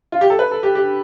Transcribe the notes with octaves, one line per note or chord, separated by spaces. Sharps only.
F4
G4
A4
B4
A4
G4
G4